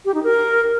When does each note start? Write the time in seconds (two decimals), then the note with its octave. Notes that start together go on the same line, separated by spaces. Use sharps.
0.05 G4
0.14 D#4
0.23 A#4